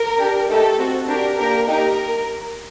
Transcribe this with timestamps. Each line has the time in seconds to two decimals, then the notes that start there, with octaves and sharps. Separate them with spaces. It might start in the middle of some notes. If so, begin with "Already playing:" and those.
Already playing: A#4
0.18 D4 G4
0.49 A3 D#4 G4 A4
0.79 C4 F#4 A4
1.08 D4 G4 A#4
1.38 A#3 D4 G4 A#4
1.68 A#3 D#4 G4 A#4